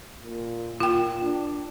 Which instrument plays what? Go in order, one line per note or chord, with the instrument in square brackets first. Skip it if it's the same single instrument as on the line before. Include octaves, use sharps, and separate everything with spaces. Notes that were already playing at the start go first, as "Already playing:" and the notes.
[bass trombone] A#2
[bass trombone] A#2 [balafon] F4 G5
[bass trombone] D4